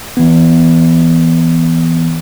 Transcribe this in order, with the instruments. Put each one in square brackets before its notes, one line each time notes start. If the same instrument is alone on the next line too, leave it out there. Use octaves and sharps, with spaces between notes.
[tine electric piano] E3 B3